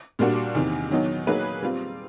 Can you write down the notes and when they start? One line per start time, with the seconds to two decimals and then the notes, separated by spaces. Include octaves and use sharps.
0.19 A#2 G3 A#3 D4 F#4
0.55 E2 C3 D#3
0.91 D#3 F#3 B3 D#4
1.27 F#3 A#3 D#4 G#4 B4
1.63 G3 C4 F4